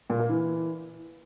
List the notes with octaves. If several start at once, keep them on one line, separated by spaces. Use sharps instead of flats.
A#2
A#3
E3